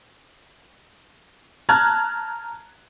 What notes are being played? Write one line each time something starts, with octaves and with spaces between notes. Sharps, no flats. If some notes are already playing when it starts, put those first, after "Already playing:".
A5 A#5 F6 F#6 G#6